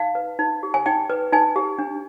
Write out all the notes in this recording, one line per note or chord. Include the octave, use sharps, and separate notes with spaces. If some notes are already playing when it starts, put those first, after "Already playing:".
Already playing: D#4 F5
B4
D#4
G4
G#5
D#4 G5
B4
D#4 G#5
G4
D4